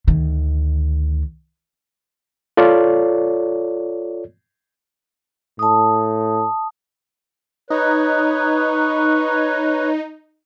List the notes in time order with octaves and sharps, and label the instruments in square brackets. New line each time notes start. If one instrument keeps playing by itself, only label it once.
[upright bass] D2 D#3
[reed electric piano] F4 A4 C#5 D5
[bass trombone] A2 [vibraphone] A5 D#6
[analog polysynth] D#4 [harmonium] B4 C#5